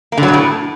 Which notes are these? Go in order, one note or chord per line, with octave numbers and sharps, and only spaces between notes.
A#3
D3
F#3
B2
A2